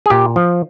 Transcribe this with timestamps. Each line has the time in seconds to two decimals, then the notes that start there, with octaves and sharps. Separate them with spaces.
0.06 G#4
0.10 A#2 G4
0.36 F3